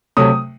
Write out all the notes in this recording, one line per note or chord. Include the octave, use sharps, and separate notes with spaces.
C3 F#3 A3 D#6